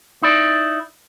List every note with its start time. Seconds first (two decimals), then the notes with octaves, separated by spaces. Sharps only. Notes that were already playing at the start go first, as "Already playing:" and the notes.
0.22 D#4 E4 D5